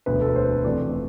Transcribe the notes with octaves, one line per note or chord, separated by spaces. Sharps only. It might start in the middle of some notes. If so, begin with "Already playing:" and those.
E1 D2 D3 B4
A4
B4
C5
F1 F2 E3 A3 D5